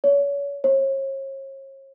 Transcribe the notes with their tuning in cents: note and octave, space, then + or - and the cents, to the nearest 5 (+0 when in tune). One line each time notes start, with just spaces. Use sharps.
C#5 +35
C#5 -40